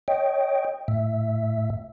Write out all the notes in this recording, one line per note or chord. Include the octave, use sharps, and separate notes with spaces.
C#5 D#5 G5
A2 E5